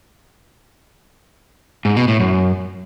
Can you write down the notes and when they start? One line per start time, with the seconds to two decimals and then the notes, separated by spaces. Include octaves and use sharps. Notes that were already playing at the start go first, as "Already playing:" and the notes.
1.85 G#2
1.97 B2
2.08 A2
2.20 F#2